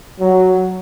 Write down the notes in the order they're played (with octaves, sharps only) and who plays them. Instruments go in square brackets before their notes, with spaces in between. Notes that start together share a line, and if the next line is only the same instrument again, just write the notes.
[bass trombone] F#3